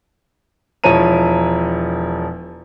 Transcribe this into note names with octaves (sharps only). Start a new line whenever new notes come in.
E1 F3 E4 C#5 A#5 D#7